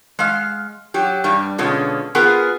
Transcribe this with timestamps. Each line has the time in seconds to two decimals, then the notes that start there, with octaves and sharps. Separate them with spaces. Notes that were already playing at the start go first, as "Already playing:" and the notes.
0.19 G#3 F5
0.94 F#3 G4
1.24 G2 G3
1.58 B2 D3 G#3 C#4 F4
2.15 B3 F4 G#4 A#4 B4